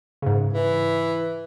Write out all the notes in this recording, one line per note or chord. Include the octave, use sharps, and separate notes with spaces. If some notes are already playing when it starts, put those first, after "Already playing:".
G#2 C#3
E3